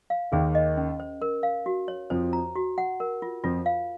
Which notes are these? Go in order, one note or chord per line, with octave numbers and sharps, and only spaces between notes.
F5
D#2 D#3 G#4
D#5
C#4
C5
A#4
F5
F#4
C#5
F2 F3 C5
A#5
F#4
F#5
A#4
F4
F2 F3 F4
F5